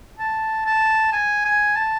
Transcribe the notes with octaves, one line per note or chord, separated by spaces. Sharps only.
A5
A5
G#5
G#5
A5